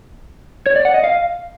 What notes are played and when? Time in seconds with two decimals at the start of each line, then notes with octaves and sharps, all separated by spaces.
0.66 C#5
0.76 D5
0.85 F#5
0.94 D#5
1.04 F5